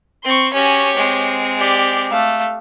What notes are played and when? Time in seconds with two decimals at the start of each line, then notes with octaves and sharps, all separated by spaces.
0.24 C4 C6 C#6
0.53 C#4 F#4 G4 C#5
0.96 G#3 C4
1.58 G4 D5
2.11 A3 F5